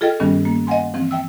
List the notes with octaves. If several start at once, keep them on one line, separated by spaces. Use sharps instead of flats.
F4 G#4 A4 D#5 G5 F6
G2 D#3 G3 B3 C#4
A#3
D#5 F5 F#5 G#5 C6
E3 F3 C4
E5 G5 E6